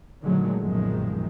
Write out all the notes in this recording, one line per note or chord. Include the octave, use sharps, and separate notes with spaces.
A#2 D3 D#3 F#3 G#3 A3
B1 F#2 A#2 D#3 F3 G#3